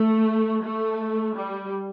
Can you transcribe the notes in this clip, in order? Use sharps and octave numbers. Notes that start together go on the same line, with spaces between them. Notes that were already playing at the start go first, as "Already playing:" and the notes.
Already playing: A3
A3
G3